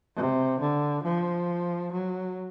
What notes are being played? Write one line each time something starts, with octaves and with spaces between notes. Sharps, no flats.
C3
D3
F3
F#3